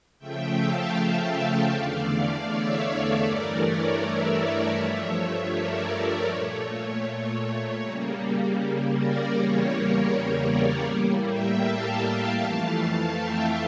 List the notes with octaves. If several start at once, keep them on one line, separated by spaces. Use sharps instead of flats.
C#3 F3 A3 E5 G5
F5 A5
E5 G5
E5 G5
E2 D3 A3 D5 F5
D5 F5
C#5 E5
G2 E3 A3 A#4 D5
C#5
C#5 E5
G2 F3 A3
A#4 D5
C#5
A#2 A3
C#3 G3 A#3
A#4 D5
E2 C#3 G3 A#3 C#5
A#4
C#5
A#4 D5
A2 G3 A#3
E5 G5
F5 A5
F2 E3 A3
E5 G5